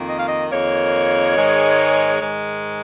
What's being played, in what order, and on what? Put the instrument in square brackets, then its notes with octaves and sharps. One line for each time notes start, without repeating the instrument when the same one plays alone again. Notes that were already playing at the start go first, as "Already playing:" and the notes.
Already playing: [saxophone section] F2 D#3 A#3
D#5
F5
D#5
F2 D#3 A#3 C#5
G#2 D#3 G#3
G#2 D#3 G#3